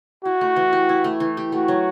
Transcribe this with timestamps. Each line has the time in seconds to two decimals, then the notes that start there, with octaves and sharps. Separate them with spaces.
0.24 E4 F#4
0.41 A3
0.56 E3
0.73 G4
0.89 E4
1.04 A3
1.20 E3
1.37 G4
1.52 A3 F#4
1.68 F#3